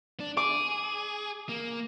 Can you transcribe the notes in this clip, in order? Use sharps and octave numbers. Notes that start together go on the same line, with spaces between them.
D4
G#4 D6
A#3